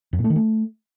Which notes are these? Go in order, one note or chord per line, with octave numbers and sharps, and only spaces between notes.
F2
A#2
A3
D#3
A3